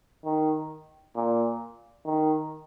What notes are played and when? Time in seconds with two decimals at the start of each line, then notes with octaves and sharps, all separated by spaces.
0.25 D#3
1.16 A#2
2.05 D#3